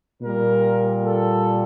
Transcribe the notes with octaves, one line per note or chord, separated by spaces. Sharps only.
A#2 G3 A#4
A4